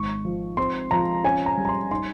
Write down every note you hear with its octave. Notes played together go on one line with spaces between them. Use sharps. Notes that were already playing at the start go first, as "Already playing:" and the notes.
Already playing: G#1 C#6
F3
C4 C6
F3 A#5
C#4 G#5
A#5
G3
A#5
C6
D#4 C6